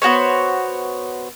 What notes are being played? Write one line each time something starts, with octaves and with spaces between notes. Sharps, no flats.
B3 F#4 C5 C#5